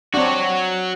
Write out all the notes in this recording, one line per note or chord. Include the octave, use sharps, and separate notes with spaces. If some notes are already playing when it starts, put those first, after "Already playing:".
C4 D4 F#4 C#5